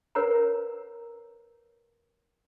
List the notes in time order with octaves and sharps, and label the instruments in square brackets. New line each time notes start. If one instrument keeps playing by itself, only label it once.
[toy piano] A#4 B4 C#5 F#5 A#5